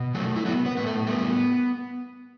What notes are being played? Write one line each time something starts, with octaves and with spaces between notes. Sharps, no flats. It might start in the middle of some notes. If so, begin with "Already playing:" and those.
Already playing: B2
F#3 A3 F#4
E4
F#3 B3 F#4
B3 B4
A2 B4
A3 A4
G3 B3 G4